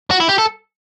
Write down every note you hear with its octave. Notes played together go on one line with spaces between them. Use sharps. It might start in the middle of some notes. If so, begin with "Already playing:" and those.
F#4
E4
G4
A4